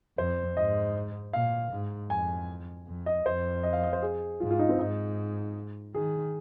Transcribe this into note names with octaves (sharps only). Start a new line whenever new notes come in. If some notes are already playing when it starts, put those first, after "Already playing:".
F2 C5
G#2 D#5
A#2 F5
G#2
F2 G#5
F2
D#5
F2 C5
D#5
F5
D#5
C5
G#4
G#2 F4
F4
D#4
C4
G#2 D#4
D#3 G#4